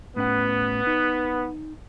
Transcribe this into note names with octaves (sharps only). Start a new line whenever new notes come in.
A2 B3 C#4 F#5
D#4